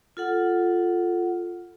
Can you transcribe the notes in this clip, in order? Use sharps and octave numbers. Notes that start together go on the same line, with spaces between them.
F4 A4 F#5